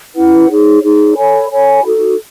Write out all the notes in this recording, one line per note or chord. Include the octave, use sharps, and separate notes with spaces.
C#4 E4 B4 F#5
D#4 G#4 C#5
D#4 G#4 C#5
A4 C#5 G#5 B5
A4 C#5 G#5 B5
D#4 F#4 A4